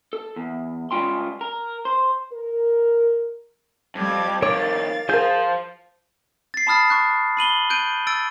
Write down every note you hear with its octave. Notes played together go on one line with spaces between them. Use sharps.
A4
E2
C#3 G3 G#3 F4 G5 C6
A#4
C5
A#4
F2 G3 D6 G#6
F2 D#3 A#4 C#5 F5 D6 A6
F3 F4 G#4 A#4 C5 G6
A6 C7
A5 B5 D#6 F6 A6 C7
C#6 F#6
B5 D#7 F#7 G7
F#6 G6 D7 D#7
E6 A6 D7